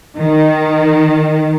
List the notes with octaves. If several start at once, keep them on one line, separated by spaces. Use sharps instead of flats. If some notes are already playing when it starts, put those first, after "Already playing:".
D#3